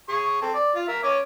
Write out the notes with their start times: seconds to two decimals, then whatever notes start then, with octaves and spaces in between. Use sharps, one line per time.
0.09 G#4 C#6
0.42 C4 A4
0.54 D5
0.75 F4
0.88 A#4 E5
1.03 C#4 C#5 D6